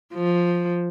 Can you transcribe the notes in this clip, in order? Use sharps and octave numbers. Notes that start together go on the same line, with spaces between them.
F3